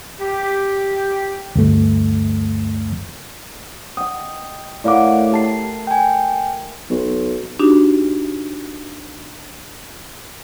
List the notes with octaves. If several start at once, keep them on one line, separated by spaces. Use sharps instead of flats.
G4
D2 G2 A3
D#5 G5 D#6
A2 A#4 D5 F5 F#5 D6
G4 A#4 A5 C7
G5 G#5
B1
D4 D#4 F#4 G4